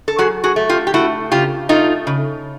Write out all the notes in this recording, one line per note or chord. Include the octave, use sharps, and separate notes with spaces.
A4
F#3 F#4 G#4
F#4 G#4
A3
F4 G4
G4
A3 E4 F#4
C#3 F4 G4
A3 D#4 F4
C#3